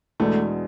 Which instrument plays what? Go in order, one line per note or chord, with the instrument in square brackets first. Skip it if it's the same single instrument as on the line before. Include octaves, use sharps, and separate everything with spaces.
[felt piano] E2 B2 G#3 D4 [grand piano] A3